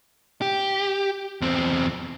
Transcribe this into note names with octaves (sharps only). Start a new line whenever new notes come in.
G4
E2 C4